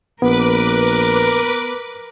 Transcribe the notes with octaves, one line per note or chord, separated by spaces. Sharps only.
A#1 B3 A#4 B4 D6